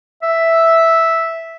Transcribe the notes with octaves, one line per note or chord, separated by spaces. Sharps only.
E5